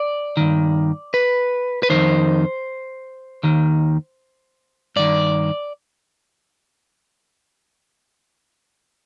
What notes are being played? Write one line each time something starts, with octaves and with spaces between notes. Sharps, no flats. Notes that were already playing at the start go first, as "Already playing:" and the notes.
Already playing: D5
G2 D#3
B4
B4
F2 C3 D#3 C5
D#2 D#3
G2 D#3 D5